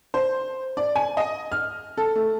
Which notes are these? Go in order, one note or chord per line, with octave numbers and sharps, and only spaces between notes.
C5
D5
G#5
D#5
F6
A4
A3